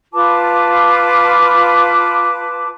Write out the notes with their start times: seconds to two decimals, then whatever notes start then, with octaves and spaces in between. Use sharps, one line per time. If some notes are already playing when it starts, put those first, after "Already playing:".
0.13 F4 B4 A5 D6